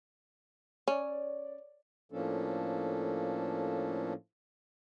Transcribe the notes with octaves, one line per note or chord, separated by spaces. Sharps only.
C#4 C#5 D5
A2 F3 A#3 C#4 D4 A4